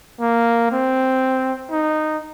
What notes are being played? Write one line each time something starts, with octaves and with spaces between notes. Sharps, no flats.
A#3
C4
D#4